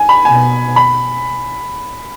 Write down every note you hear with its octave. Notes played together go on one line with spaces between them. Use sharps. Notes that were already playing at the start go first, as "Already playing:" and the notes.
Already playing: G#5
B5
B2 G#5
B5